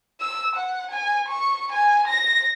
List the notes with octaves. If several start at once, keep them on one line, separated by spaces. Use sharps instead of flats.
E6
F#5
G#5
C#6
G#5
A#6